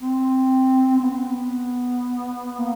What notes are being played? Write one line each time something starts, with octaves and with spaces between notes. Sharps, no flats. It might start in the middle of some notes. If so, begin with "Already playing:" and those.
C4
C4
B3
A#3